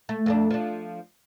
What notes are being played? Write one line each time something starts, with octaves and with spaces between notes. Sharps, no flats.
A3
F2 A3 D4
F3 D4